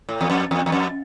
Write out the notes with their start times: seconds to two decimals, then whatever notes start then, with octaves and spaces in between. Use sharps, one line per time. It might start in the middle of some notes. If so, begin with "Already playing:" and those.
0.09 A2
0.21 E2
0.30 F2
0.51 E2
0.66 E2
0.72 F2